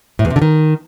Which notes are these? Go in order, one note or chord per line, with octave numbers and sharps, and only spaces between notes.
A2
E2
C3
D3
D#3